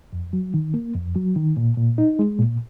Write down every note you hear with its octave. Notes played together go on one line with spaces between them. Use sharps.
F2
F#3
D#3
A#3
F2
F#3
D#3
A#2
A#2
D#4
G#3
A#2